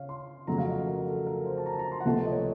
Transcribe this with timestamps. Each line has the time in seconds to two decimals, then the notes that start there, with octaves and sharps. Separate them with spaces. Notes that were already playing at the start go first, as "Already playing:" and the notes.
Already playing: C#3 C#5 F5
0.09 C6
0.47 F2 C#3 F#3 A3 A#5
0.58 F5
0.68 D#5
0.87 A#4
1.07 A4
1.27 A#4
1.46 C5
1.58 A5
1.66 A#5
1.73 A5
1.79 A#5
1.92 C6
2.00 F#5
2.05 C#2 C3 F3 A3 A5
2.25 D#5
2.32 C#5